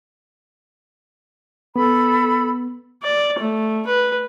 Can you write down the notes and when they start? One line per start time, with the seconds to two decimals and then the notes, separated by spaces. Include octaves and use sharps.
1.76 B3 A4 B5
3.03 D5
3.39 A3
3.87 B4